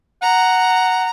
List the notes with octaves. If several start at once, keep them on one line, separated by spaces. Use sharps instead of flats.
F#5 A#5